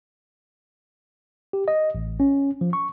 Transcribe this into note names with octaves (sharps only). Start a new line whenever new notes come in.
G4
D#5
A1
C#4
F3
C#6